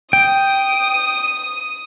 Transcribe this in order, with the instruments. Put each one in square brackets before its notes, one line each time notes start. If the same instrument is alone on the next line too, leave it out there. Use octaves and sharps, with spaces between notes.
[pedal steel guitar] G5 [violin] D#6